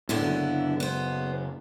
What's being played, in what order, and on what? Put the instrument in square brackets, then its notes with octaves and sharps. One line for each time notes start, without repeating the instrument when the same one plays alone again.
[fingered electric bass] A2 [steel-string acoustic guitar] D3 B3 E4
[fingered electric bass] F#1
[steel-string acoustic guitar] B3 C5